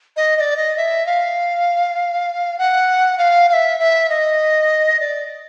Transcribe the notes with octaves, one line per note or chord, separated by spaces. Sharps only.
D#5
D#5
D5
D#5
E5
F5
F#5
F5
F5
E5
E5
D#5
D5